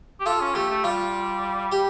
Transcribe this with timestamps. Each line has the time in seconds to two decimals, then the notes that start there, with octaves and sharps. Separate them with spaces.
0.20 G4
0.26 F4 A4
0.41 C#4
0.55 A3 G4
0.70 A3
0.84 G3 F4
1.72 G4